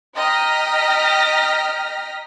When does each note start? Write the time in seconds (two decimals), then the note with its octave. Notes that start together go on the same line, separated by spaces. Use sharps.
0.15 D#5 G5 A#5 F6 A#6 B6